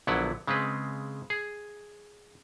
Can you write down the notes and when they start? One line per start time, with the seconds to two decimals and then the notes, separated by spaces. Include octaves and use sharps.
0.07 A#1 D3 F#3 B3 E4 F#5
0.47 C#3 G#3 C4 B4
1.30 G#4